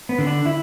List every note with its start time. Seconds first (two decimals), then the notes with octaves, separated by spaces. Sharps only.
0.09 B3
0.18 D3
0.27 D4
0.46 E4